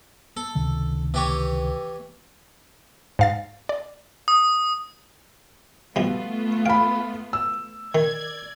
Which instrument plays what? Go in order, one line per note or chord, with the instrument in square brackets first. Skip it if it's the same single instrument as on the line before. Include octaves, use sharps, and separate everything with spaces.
[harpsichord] A4
[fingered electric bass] C#2 C3 D#3
[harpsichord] E3 G4 C#5
[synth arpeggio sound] G#2 F5 A6
D5
[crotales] D#6
[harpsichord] G2 B2 F3 [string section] A3 B3 F4
[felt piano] F5 B5 [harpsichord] G5
[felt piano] E6
[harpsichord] D#3 [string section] D5 G#6